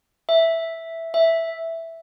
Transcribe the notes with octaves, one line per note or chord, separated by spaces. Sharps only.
E5
E5